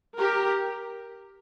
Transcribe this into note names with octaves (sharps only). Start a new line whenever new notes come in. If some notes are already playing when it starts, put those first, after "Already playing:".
G4 A#4